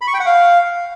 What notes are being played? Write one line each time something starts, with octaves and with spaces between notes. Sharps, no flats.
B5
C#6
G5
F#5
F5